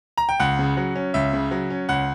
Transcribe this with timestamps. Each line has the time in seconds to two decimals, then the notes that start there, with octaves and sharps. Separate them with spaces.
0.17 A#5
0.29 G5
0.40 C#2 F#5
0.59 C#3
0.77 F#3
0.96 C#4
1.14 C#2 E5
1.33 C#3
1.51 F#3
1.70 C#4
1.89 C#2 F#5